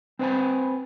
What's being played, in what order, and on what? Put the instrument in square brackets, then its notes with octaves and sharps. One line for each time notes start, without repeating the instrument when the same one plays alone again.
[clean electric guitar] C4 B4 C5 F5 G#5 B5